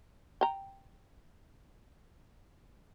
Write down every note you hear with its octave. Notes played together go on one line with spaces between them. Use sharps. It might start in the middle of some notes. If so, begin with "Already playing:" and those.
G5 A#5